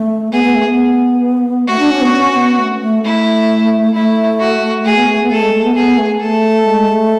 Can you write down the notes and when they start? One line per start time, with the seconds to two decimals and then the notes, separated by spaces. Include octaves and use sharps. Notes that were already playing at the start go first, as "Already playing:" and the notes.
Already playing: A3
0.32 B3 G#4
0.44 B3
0.55 A3
0.66 B3
1.68 A3 F#4
1.79 D4
1.91 C#4
2.01 B3
2.13 C#4
2.36 B3
2.59 A3
2.81 A3
3.04 A3 E4
3.94 A3 E4
4.40 F#4
4.85 A3 G#4
4.96 B3
5.08 A3
5.23 B3
5.30 A3 A4
5.42 G#3
5.52 A3
5.64 B3
5.75 B3 G#4
5.98 A3
6.21 A3 A4
6.66 G#3
6.88 A3